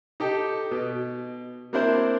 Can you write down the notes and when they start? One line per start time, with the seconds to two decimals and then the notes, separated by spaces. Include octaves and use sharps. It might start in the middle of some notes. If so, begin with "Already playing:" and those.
0.20 D#4 G4 A4
0.71 B2
1.73 A#3 C4 D4 E4 A#4 C5